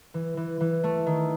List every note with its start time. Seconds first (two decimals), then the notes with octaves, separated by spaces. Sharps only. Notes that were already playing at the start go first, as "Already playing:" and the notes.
0.14 E3
0.37 E3
0.61 E3
0.84 A3
1.06 D#3